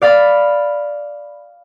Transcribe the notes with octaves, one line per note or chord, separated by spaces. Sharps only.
D5 F5 B5 A6